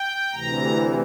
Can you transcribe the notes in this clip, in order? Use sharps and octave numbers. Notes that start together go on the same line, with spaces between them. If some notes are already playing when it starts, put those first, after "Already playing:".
Already playing: G5
D2 C3 E3 A#5